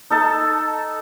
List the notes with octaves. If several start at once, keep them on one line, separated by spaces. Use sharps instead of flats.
D#4 A4 A5